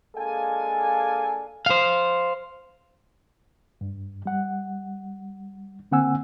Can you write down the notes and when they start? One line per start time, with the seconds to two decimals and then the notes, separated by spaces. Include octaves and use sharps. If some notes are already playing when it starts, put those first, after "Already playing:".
0.17 G#3 A#3 D4 A4 F5 G#5
1.66 C5 F5
3.81 G2
4.26 G3 F#5
5.91 D3 A#3 C4 F#5 G#5 E6